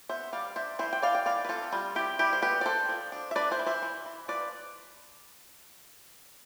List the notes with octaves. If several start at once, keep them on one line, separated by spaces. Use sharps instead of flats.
B3 C5 E5
G3 D5 F5
D4 C5 E5
E3 C5 E5
G5
E3 D5 F5
G5
E3 D5 F5
B4
C4 F4 A4
G3 F4
C4 E4 G4
G3 E4 G4
C5
B3 G4 B4
D5
D4 A4 C5
F3
D4
E5
D4 B4 D5
C5 E5
E3
C5 E5
E3
E3
F3 B4 D5